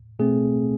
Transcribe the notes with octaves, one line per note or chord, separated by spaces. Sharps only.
B2 A3 C4 G#4